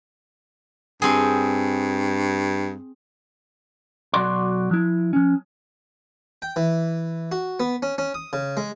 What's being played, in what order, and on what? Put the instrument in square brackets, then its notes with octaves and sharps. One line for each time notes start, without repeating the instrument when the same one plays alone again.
[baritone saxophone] G2 [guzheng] C4 G#4
[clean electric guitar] B1 F#3 F#4 D5 C6
F3 E4
F3 C#4
[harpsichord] G5
E3
F#4
B3
C#4
C#4
D#6
C#3
G#3